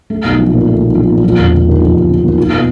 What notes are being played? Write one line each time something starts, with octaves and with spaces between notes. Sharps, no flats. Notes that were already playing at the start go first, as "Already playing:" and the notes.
A3
B1
F3
A#2
A3
B1
F3
A#2
F3
E1
C#3
D#2
F3
E1
C#3
D#2
F4
B2